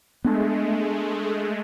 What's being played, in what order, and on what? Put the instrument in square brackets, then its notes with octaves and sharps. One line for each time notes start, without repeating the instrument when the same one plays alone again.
[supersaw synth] G#3 A3 [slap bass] B3 D4